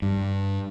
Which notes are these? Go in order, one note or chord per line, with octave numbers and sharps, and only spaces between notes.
G2